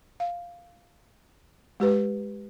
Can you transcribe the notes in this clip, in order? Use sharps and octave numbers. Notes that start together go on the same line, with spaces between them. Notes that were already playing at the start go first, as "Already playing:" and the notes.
F5
G#3 G4 B4